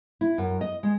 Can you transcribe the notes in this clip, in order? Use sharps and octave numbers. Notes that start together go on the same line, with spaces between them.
E4
F#2
D#5
G#3